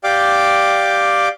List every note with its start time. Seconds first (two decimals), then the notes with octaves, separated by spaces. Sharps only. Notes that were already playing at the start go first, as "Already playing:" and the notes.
0.04 G4 D5 F5 G5 D6